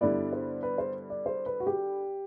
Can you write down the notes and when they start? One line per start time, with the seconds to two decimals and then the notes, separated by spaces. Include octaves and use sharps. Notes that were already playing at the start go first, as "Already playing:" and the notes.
0.01 G2 D3 G3 B3 E4 D5
0.33 C5
0.63 B4
0.78 C5
1.10 D5
1.26 C5
1.46 B4
1.60 F#4
1.67 G4